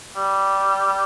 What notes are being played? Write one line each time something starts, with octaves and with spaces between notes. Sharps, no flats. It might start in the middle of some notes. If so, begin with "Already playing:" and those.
G3